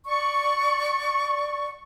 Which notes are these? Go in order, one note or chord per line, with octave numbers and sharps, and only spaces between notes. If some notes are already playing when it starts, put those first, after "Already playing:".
D5 C#6